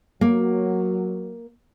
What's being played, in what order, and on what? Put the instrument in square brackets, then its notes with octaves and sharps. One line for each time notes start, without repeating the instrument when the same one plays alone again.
[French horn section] F#3 [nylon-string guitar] A#3